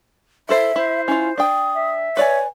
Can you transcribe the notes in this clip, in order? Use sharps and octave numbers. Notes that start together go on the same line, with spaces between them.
E4 A4 C5 E5
E4 C5
C#4 E4 F4
D4 G5 D#6
E5
B4 C#5 D5 G#5